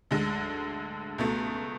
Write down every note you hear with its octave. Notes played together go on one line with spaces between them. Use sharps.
D2 D3 G#3
C#2 B2 A3